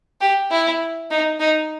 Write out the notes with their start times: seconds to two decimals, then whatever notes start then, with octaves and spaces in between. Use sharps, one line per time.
0.21 G4
0.51 E4
1.11 D#4
1.40 D#4